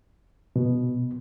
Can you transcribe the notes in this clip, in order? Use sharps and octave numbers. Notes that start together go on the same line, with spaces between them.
B2